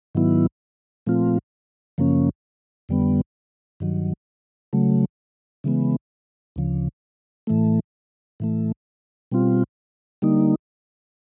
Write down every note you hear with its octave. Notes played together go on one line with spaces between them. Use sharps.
G#2 D#3 F#3 B3 E4
A#2 F3 A3 C4 F4
F#2 C#3 F3 A#3 C#4
F2 D3 G3 B3
G2 D#3 F#3
C#3 F#3 A3
C#3 E3 G#3 B3
D2 C#3 F3
A2 E3 A3
A2 E3 A3
B2 G3 C4 F4
D3 G3 A#3 D#4